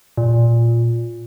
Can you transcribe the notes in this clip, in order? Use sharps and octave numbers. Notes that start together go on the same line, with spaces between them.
A#2